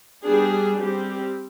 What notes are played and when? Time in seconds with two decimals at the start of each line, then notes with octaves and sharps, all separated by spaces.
0.23 G3 B3 D4 G#4
0.77 G3 C4 G4